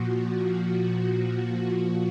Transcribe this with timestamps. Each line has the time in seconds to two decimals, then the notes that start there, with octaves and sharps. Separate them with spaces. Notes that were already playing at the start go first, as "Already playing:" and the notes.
Already playing: A#2 F3 F#4